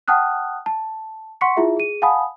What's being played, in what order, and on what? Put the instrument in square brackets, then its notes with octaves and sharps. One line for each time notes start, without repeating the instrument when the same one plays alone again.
[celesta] F#5 G5 A5 D#6 F6 F#6
A5
F#5 C6 C#6 B6 C#7
E4 F4 G#4 E5
G#4 D#7
F5 F#5 G#5 A5 B5 D#6